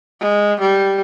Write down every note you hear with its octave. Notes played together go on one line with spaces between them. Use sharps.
G#3
G3